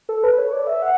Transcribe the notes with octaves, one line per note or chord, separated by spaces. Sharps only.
A4
B4
C#5
D5
E5
F#5